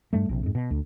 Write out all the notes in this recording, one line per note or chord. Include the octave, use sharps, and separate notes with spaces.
G2 G3 A3
A#1 C3
F2 G#2
B2
D2